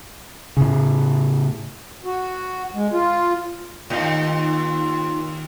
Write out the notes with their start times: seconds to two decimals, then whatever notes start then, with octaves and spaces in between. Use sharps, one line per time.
0.57 A2 C#3
2.05 F#4
2.74 G#3
2.93 F4
3.90 D#2 D#3 D#4 F4 F5